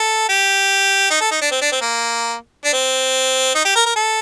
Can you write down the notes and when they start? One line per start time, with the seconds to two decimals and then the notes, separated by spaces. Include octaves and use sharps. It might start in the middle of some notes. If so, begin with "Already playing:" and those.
Already playing: A4
0.29 G4
1.11 D#4
1.21 A4
1.31 D#4
1.41 D4
1.51 C4
1.61 D4
1.72 C4
1.82 A#3
2.65 D4
2.73 C4
3.55 D#4
3.65 G4
3.76 A#4
3.86 A#4
3.96 A4